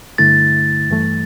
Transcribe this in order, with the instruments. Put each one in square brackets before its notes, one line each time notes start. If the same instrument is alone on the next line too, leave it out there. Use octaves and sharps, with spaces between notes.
[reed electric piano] G2 D3 A3 E4 [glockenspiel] A6
[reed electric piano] G2 E3 A3